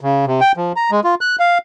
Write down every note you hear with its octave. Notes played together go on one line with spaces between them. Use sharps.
C#3
C3
G5
F3
A#5
G#3
F4
F#6
F5